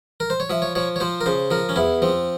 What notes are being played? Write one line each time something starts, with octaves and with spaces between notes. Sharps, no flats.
A#4
C5
C#5
F3 E5
C#5
F3 C#5
C#5
F3 C5
A#4
C#3 C5
F3 A#4
C#4
E2 E4
F3 C4